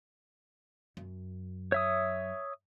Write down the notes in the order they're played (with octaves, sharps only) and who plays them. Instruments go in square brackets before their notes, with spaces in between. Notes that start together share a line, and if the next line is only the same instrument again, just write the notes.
[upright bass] F#2
[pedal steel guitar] C#5 E5 D#6